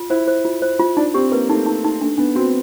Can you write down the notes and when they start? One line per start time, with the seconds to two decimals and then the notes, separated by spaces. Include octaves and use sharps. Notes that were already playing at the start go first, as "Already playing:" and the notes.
Already playing: F4
0.10 E4 C5
0.28 C5
0.45 F4
0.62 C5
0.79 F4
0.97 D4 D#4
1.14 C4 G4
1.32 A#3 B4
1.49 A3 D#4
1.66 D#4
1.84 D#4
2.01 A3 D4
2.18 B3 D4
2.35 C4 F#4